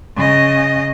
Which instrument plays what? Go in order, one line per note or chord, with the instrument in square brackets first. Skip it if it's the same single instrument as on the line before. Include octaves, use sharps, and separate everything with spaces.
[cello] C#3 D#5